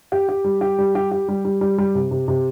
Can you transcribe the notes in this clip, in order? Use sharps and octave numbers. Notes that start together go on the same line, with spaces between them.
G4
G4
G3
G4
G3
G4
G4
G3
G3
G3
G3
C3
C3
C3